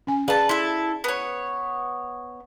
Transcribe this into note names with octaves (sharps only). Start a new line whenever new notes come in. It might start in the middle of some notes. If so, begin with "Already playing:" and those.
C#4 G#5
G#4 B4 D5 F5 A5
E4 A4 C6
B3 C#5